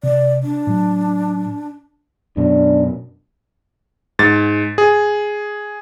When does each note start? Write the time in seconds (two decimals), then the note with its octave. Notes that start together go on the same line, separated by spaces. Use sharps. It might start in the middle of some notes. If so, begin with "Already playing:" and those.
0.03 C3 D5
0.43 D4
0.67 A2 F#3
2.37 F#2 B2 D4
4.19 G#2 A6
4.78 G#4